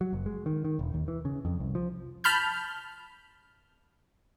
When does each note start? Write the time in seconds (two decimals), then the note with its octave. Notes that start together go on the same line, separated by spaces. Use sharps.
0.01 F#3
0.13 F#1
0.26 G#3
0.46 D#3
0.65 D#3
0.79 E1
0.94 D#2
1.08 E3
1.25 C#3
1.45 F2
1.60 C2
1.75 F3
2.24 A5 B5 F6 G6